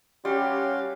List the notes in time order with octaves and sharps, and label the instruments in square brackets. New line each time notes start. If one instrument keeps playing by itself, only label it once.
[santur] G3 [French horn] C#4 [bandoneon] F#4 F5 C6 [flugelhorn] G4